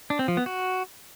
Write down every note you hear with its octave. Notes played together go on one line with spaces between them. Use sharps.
D4
C4
F3
B3
F#4